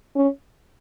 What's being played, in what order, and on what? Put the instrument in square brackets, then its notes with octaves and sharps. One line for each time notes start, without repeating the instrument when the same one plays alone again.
[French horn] C#4